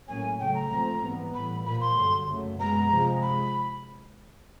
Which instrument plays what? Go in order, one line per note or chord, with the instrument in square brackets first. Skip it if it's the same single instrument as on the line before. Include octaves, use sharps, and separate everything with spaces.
[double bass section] A2 F#3 A#3 C#4 [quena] G#5
[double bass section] C#3 F#3 A3 C#4 [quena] G5
[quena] A#5
[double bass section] A#2 F3 A3 C4
G#2 E3 G3 B3
[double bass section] A2 E3 G3 [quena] B5
[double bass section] A#2 F3 A#3 [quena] B5
[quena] C6
[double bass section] G2 D3 F#3
F#2 C#3 F#3 A3
[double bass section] B2 G#3 B3 [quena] A#5
[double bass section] C3 F3 G#3
[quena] B5